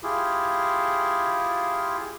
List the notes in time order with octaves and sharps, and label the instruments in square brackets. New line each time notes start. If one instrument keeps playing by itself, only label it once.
[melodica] E4 F4 G4 G#4